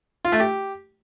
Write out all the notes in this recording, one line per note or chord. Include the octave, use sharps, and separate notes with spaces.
F4
A3
G4